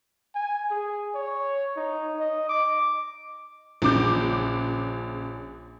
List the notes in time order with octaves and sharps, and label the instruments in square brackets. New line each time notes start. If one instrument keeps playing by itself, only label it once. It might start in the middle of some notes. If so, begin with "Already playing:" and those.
[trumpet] G#5
G#4
C#5
D#4
D#5
D6
[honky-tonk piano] A#1 C#3 D6 G6